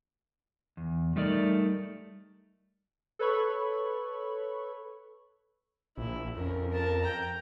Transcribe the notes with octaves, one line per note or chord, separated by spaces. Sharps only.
E2
G3 A3 D#4 A#4 D5
A4 B4 C#5 B5 C#6
A#1 E4
F2 C#4 A#4
A#4 A5
G5 A#5